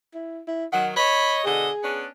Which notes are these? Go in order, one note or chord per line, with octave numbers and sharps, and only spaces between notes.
E4
E4
D#3 F#3 F#5
C#5 D#5 B5
B2 D3 G#4 D#5
B3 C#4 D4